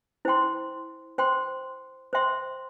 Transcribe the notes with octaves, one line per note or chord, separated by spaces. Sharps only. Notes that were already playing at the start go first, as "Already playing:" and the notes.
E4 C5 G5 C6
C5 G5 C6
C5 E5 G5 C6